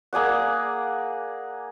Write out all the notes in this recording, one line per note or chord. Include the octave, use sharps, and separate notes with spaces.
A#3 G#4 D5 F#5